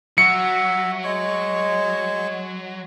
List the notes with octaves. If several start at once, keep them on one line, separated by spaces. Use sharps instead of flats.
F#3 F#4 E5 C#7
G#3 C#5 C#6